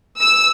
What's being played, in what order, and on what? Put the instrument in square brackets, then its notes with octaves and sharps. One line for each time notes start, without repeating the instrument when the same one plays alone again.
[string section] E6